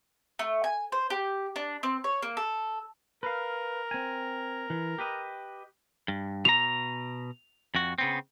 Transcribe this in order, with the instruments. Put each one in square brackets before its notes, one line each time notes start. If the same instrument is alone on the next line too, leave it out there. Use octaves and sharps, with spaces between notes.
[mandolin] A3
G#5
C5
G4
D4
C4
C#5
A#3
A4
[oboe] A#4 [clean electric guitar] B4 F5
[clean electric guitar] C4 G#5
E3
G4 B4 D#5
G2
[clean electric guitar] B2 A#5 [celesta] F7
[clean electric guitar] F2 F#4
C#3 B3 C4